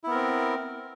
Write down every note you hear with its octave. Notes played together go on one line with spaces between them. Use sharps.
B3 C4 E4 A#4